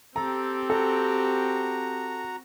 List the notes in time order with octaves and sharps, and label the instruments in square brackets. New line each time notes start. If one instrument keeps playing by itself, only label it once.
[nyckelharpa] C4 G4 [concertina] A4 [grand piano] A#5
[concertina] F#4 A#5 [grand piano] A4